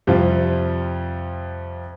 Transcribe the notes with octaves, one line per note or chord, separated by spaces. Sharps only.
F2 C3 G3 C4 F4